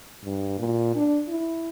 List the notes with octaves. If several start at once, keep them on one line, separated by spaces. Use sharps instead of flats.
G2
A#2
D4
E4